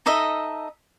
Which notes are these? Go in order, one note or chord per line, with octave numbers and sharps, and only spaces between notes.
D#4 A4 D#5 E5